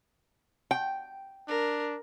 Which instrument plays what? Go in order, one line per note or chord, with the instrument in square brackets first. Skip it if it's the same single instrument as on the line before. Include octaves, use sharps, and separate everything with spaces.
[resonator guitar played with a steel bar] G5
[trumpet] D4 [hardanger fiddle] A#4